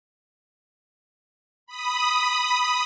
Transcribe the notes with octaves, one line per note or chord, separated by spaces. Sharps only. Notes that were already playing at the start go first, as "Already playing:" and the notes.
B5 D#6